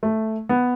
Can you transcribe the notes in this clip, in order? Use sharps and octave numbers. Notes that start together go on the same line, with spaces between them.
A3
B3